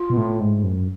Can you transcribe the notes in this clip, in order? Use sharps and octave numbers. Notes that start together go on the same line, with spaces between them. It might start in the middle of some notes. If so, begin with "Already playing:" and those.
Already playing: F4
B2
A2
G#2
F#2